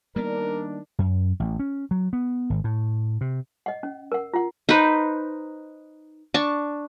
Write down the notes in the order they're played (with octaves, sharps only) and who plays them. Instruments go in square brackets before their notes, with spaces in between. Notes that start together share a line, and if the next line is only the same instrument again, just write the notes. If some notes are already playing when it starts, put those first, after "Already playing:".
[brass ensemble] D#3 D4 [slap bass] G3 A#3 B3 [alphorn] A#4
[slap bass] F#2
A1
C#4
F#3
B3
G#1
A2
C3
[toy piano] D#5 F#5
C#4
A#4 F#5
F4 F#5
[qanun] D#4 B4 C5
D4 A5 C#6